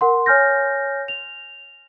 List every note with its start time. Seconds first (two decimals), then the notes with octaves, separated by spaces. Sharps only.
0.01 A#4 F#5 C6
0.26 C#5 G#5 F6 G6 A#6
1.08 F7